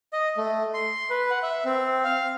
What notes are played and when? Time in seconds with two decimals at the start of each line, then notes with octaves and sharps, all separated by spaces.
0.13 D#5
0.37 A3
0.74 C6
1.10 B4
1.31 F#5
1.43 E5
1.65 C4
2.04 F5